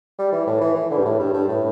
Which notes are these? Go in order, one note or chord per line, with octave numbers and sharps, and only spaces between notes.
G3
E3
A2
E3
E3
D3
G2
A2
G2
G2
A2